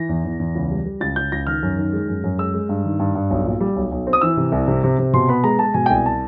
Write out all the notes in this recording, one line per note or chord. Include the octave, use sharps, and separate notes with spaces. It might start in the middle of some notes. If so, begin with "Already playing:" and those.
Already playing: E3 A#6
E2
E2
E2
C#2
G3
G3
C#2 A6
C#2 G6
C#2 A#6
D#3 F6
F#2
D#3
G#3
F#2
F#2
G#3 E6
G#3
G2
D#3
G2
G2
B1
A#2
G3
B1
B1
C4
D#6
E3 E6
C3
C2
C3
C3
C3
B2 C6
B3 B5
G#3 A#5
G#3 A5
B2 G#5
G5
C2 G#5
A5